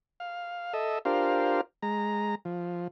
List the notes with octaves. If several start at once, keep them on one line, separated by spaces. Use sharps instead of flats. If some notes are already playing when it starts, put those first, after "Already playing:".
F5
A4 D#5 E5
D4 F4 G4 A#4 C5 F5
G#3 A#5
F3